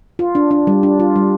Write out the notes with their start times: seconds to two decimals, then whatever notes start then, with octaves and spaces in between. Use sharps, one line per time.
0.19 F4
0.35 D4
0.51 D4
0.67 G3
0.83 D4
1.00 F4
1.16 G3